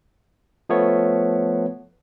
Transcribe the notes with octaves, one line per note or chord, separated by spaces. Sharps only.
F3 A3 B3 C#5